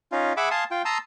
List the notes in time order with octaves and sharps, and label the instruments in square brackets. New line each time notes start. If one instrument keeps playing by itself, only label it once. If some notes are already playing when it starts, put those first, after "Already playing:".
[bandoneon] C#4 D#4 F4
G#4 E5 F#5 B5 D6
F5 G#5 A5 C6 D#6
F4 G5
A5 A#5 C6 D#6 E6